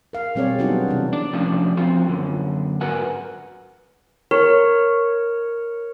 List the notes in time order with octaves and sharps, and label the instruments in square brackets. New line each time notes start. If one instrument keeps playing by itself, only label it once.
[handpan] A#4 F5
B2 G3 C4 G#4 C#5 D5
F#3 G3 B3 D4 D#4 F#4
C3 E3 D4
[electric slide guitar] D4
C3 F3 A3 C#4 D4 F#4
F3 C4 F4 F#4
F#2 D3
G#2 F#4 A#4 B4 F#5 G#5
[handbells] A#4 [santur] C#5